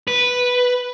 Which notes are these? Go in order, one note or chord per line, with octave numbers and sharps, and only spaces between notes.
B4